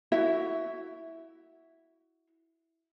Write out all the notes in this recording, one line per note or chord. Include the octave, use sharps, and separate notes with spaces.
E4 F#4 E5